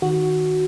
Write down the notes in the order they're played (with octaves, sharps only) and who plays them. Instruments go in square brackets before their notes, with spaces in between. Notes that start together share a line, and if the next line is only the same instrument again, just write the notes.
[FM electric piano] D#3 F#4